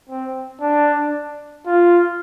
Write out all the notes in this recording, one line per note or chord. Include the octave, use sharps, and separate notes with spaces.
C4
D4
F4